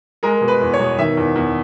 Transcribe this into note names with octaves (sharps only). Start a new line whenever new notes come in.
G#3 A#4
B2
B4
E2
C#5
B2
D#3 E5
E2
E2